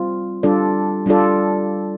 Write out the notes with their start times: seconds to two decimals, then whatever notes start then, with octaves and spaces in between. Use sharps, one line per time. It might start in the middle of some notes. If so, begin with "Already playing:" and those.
Already playing: G3 C4 F4
0.43 G3 D4 F4 A4 D5
1.06 G3 D4 F4 A4 D5